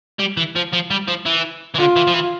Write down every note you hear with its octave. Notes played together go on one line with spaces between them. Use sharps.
G3
E3
F3
F3
G3
F3
E3
E3
D3 F4
E3
F3
E3